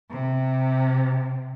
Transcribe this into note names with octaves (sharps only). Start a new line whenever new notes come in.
C3